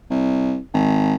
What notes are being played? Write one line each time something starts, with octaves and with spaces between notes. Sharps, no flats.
C2
G#1